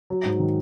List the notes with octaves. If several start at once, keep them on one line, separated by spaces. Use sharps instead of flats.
F#3
G#2
D#3